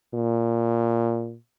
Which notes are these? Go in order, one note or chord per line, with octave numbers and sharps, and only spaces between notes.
A#2